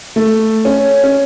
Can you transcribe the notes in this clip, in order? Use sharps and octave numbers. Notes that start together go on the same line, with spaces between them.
A3
C#4
C#4